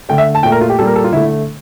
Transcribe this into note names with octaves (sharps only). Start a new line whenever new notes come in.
D3 A3 G5
E5
A5
A#2 A3 G5
A#4
F4
G4
A#2 G3 A#3 A4
A#4
A4
F4
D3 A3 E4